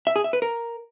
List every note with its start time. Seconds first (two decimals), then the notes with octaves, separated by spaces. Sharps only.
0.07 E5
0.16 G#4
0.24 E5
0.33 B4
0.42 A#4